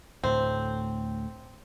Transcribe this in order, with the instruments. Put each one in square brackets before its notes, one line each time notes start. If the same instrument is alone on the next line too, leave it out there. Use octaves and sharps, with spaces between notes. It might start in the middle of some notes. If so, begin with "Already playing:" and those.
[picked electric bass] D2 A2 A3 [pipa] C4